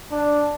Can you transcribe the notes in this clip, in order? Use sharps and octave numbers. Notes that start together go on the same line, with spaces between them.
D4